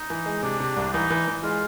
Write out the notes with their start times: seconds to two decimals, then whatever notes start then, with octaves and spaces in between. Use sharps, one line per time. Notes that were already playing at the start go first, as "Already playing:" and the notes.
Already playing: D#4
0.10 E3
0.26 G#3
0.43 C3 D4
0.60 C3
0.76 C2
0.93 E3 D#4
1.10 E3
1.28 E3
1.43 G#3 F4